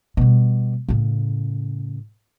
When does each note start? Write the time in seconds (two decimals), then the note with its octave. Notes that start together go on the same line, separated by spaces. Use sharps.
0.17 B2 G3
0.89 A2 C#3